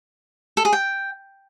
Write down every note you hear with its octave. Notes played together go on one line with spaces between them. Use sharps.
A4
G#4
G5